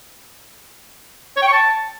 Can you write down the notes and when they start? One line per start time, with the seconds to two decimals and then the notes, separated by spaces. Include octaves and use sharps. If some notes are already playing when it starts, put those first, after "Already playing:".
1.36 C#5
1.42 G5
1.47 C#6
1.53 A5